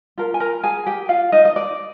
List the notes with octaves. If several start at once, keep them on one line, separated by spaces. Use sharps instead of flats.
F4 A#4
G#5
A#4 A#5
G#4 G#5
G4 G5
F4 F5
D#4 D#5
D#5
D5